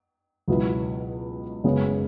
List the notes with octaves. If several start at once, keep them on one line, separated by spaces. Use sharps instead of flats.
C#2 B2 F#3 B3 E4
F#1 F#2 C#3 G#3 B3